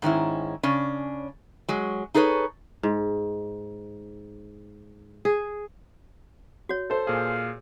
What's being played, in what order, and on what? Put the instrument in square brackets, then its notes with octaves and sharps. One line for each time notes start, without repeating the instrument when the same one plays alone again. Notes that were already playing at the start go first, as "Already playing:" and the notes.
[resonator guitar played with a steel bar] G#2 D#3 C#4 E4
C#3 C#4 D4
F#3 G#3
D#4 G#4 A4 B4 C#5
[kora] G#2
G#4
[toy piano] F#4 C#5
[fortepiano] A4 C5
[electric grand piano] A#2 G#4 [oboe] F5